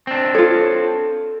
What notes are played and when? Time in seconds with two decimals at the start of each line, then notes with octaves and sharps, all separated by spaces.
0.07 C4 D4
0.35 F4 A4 C#5